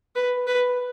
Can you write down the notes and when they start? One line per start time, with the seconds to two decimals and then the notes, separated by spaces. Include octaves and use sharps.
0.16 B4
0.47 B4